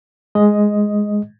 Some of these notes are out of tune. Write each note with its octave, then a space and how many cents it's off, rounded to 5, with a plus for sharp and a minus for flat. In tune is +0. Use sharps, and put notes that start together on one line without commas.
G#3 +0 D#5 +5